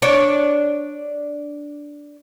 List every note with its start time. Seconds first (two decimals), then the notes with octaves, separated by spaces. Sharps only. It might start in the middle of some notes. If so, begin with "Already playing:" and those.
0.02 D4 C#5